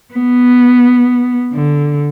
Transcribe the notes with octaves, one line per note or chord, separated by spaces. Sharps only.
B3
D3